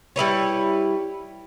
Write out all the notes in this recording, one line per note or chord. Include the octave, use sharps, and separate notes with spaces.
G3 E4 B4 C#5